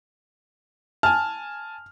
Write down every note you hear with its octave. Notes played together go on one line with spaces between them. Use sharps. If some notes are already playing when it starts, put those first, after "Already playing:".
G#5 A5 F6